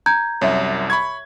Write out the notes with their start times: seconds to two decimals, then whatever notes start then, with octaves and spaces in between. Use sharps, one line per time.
0.06 A#5 G6 G#6
0.41 C2 F#2 C#5 E5
0.90 B5 C#6 G#6